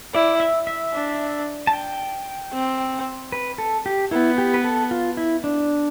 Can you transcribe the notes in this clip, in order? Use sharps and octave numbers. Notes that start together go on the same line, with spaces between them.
E4 D5
E5
E5
D4
A5
G5
C4
B4
A4
G4
B3 E4
G4
B4
A4
F4
E4
D4